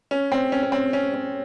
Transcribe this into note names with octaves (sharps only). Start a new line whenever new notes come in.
C#4
C4
C#4
C#4
C4
C#4
C#4